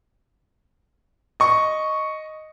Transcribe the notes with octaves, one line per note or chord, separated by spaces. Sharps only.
D#5 C#6